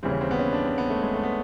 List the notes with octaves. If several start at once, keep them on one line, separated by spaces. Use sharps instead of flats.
D#2 C#3 E3 G3 C4
C#4
C4
B3
C#4
D4
C4
B3
A3
G#3
A3
B3